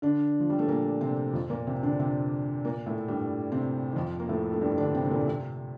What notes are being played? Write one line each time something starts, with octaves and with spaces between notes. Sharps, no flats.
D3 D4
F3
G3
A3
A#2 A#3
C3 C4
F2 F3
A#2 A#3
C3 C4
D3 D4
C3 C4
A#2 A#3
A2 A3
G2 G3
C3 C4
D#3
F2 F3
A#3
A2 A3
A3
G2 G3
D3 D4
C3 C4
A3
A#2 A#3
C3 C4